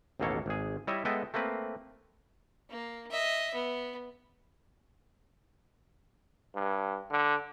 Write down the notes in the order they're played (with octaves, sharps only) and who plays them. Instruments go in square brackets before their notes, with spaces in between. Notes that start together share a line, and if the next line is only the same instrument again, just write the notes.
[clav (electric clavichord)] A1 D#2 B2 A#3 A4 C#5
G#1 G#4
G3 E4 C#5 D#5 E5
G#3 B3 A4 D#5 E5 G5
A3 A#3 C4 B4
[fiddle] A#3
D#5 E5
B3
[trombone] G2
D3